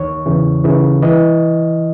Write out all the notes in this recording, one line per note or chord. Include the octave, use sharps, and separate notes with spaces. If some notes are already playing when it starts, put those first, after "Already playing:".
Already playing: D#2 D#3 C#5
E2 C#3 E3
D#2 C#3 E3
E3 D#5